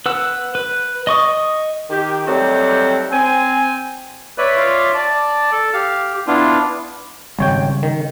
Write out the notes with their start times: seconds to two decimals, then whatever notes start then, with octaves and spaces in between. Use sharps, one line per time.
0.06 B4 F#5 E6
0.55 B4
1.07 D#5 C#6 D#6
1.90 D#3 G4
2.27 F#3 G3 A3 C4 D#4 G4
3.11 C4 G#5
4.38 B4 C#5 D5 E5
4.56 F4
4.95 D5 A5
5.52 A4
5.74 G4 F5
6.27 B3 D4 E4 F4
7.39 G#1 C#3 G3 C#5 G5
7.83 D#3